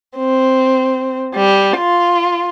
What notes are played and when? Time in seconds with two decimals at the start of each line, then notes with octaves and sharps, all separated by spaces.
0.17 C4
1.34 G3
1.77 F4